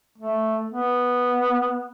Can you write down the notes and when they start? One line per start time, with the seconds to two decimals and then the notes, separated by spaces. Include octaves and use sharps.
0.18 A3
0.72 B3